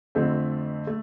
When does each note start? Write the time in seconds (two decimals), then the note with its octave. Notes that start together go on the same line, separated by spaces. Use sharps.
0.15 F2 D3 A3 C4
0.87 A3